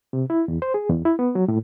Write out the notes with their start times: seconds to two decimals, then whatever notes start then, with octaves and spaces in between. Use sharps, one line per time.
0.13 C3
0.30 E4
0.48 E2
0.62 C5
0.74 G#4
0.89 E2
1.05 E4
1.19 B3
1.35 F#3
1.48 A2